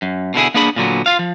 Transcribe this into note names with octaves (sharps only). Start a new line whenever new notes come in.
F#2
B2 D3 E4 G#4
A#3 B3 D4 G#4 B5
A#2 D3 F#3 B3
F4 F5
F3